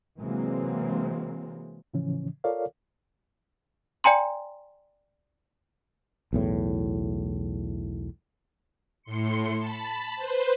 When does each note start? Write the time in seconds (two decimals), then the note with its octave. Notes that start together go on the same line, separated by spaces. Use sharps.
0.19 C3 E3 F#3 G#3 A#3 C4
1.94 A2 C#3 E3 F3 C#4
2.44 F4 A4 A#4 C#5 D5 F5
4.04 D5 G5 G#5 A#5 C6
6.33 B1 E2 A2
9.03 A2 C6 C#7
9.58 A5 B5
10.16 B4 C5